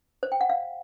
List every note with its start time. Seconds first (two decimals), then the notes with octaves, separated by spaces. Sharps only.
0.23 C5
0.32 G5
0.41 F#5
0.50 F5